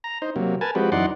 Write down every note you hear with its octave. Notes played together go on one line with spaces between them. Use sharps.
A#5
D#4 C5
C3 F#3 A#3
A#4 B4 G#5 A5
F3 G#3 C4 F#4 G4 B4
F#2 E3 D#4 D5 F#5 C6